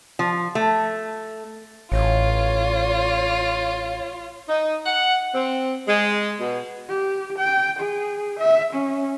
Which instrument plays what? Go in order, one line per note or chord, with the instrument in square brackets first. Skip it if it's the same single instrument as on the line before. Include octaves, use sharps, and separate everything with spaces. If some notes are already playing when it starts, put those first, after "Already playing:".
[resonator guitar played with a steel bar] F3
A3
[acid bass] A1 [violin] F4 [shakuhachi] C#5
[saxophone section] D#4
F#5
C4
G#3
B2
[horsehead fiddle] G4
G5
G#4
E5
C#4